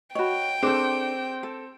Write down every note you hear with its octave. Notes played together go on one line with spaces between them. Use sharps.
F#4 C#5 D#5 G5 B5
C4 D4 G#4 A4 D6
A4